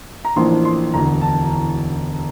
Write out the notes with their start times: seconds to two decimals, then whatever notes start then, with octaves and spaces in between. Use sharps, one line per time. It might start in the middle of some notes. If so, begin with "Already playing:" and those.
0.25 A#5
0.36 A1 A2 F3 A#3 D4 C6
0.65 C6
0.93 E1 D2 D3 A#5
1.21 A5